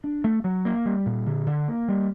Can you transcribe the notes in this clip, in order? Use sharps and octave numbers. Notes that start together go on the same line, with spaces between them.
D4
A3
F#3
A#3
G3
A#2
D3
D3
A#3
G3